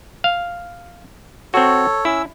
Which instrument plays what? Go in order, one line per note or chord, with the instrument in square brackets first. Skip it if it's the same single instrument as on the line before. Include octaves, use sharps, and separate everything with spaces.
[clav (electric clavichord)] F5
[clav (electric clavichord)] C4 F#4 [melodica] A4 C#5
[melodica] C#4 E6 [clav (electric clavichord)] E4